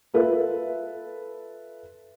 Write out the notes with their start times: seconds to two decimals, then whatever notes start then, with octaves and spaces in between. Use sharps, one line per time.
0.14 F4 A4 B4 E5